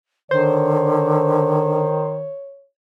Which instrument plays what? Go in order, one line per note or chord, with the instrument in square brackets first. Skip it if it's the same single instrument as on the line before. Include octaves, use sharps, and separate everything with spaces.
[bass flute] D3 [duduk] D#3 [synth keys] C5 [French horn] C#5